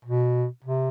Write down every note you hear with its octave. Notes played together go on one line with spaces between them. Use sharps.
B2
C3